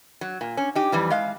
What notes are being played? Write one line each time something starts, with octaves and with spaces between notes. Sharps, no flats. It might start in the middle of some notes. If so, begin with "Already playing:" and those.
F#3
A#2
C#4
D#4 G4
F2 E3 G3
G#3 F5